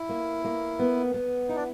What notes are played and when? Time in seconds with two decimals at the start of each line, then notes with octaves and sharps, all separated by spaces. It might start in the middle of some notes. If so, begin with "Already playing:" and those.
Already playing: E4
0.09 A#3
0.44 A#3
0.79 B3
1.14 B3
1.49 D#4 E4
1.56 D4